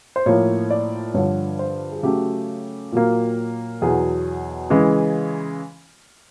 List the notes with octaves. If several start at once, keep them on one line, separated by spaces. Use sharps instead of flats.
C5
A2 F3 A#3 C#5
D5
G2 D3 F3 C#5
C5
G#4
C#3 F#3 A3 G4
A#2 F#3 A#3
E2 B2 F#3 G#4
C#3 E3 G#3